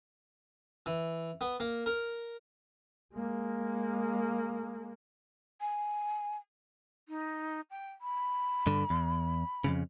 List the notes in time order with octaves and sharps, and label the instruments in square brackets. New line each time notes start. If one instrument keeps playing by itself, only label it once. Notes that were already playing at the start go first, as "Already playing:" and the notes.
[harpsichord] E3
B3
A#3
A#4
[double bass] G#3 A#3
[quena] G#5
[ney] D#4
G5
B5
[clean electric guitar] G2 D3
E2
F2 G#2 C#3